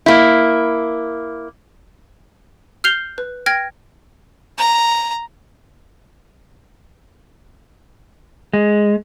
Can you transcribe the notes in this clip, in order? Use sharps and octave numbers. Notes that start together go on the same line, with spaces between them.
A#3 E4
F6 G6 C7 F7 G7
B4
G5 F6 G#6 A#6
A#5
G#3